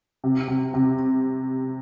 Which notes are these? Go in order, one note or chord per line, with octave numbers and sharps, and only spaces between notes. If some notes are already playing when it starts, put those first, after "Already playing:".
C3
C3
C3